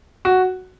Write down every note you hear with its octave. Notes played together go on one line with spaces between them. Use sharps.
F#4